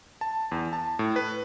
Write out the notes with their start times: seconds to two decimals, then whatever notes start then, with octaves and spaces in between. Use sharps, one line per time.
0.21 A5
0.52 E2
0.73 A5
0.99 A2
1.16 B4